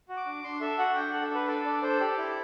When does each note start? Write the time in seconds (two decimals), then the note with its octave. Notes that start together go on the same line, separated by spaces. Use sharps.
0.09 F#4
0.17 D6
0.26 D4
0.44 D4 C6
0.61 A4 E5
0.78 F#4 F#5
0.96 D4 G5
1.09 A4 F#5
1.21 A4
1.31 D4 B4
1.48 A4 D5
1.65 D4 D5
1.83 A4 C5
2.00 G4 D5
2.18 E4